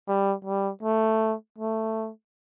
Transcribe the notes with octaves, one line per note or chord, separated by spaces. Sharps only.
G3
G3
A3
A3